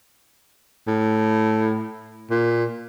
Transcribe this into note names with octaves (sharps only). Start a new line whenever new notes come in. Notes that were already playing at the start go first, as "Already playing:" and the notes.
A2
A#2